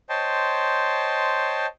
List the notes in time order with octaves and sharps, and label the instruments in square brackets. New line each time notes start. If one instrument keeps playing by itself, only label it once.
[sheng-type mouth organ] C5 C#5 D#5 G5 A5 C6